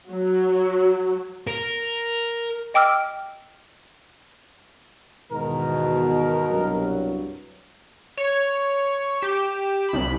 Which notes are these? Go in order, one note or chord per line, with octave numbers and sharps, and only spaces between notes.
F#3
A#4
D#5 G5 D6 E6 F6
E2 G#2 B2 D#3 A#4
C2 G2 F#3
C#5
G4 E7
C2 B5